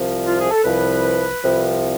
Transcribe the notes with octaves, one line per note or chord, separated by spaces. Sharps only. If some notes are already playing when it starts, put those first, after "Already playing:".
Already playing: C2 C3 F3
F4
G#4
A4
C2 C3 F3 B4
C2 C3 F3